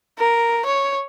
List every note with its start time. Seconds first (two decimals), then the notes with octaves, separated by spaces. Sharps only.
0.18 A#4
0.66 C#5